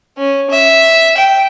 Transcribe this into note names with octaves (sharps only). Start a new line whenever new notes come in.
C#4
E5
G5